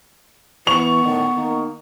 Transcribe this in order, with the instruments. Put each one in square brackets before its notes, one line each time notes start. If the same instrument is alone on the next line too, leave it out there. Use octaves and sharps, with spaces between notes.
[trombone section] E3 [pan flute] B3 [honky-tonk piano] C#6 F7
[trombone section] A2 D3 D#3
D#3 A#3 D#4